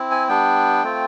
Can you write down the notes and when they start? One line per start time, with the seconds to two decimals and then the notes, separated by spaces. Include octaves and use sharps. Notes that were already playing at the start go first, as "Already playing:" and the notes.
Already playing: C4 E4
0.11 G#5
0.29 G3 B3 D4 G5
0.83 A3 C4 F4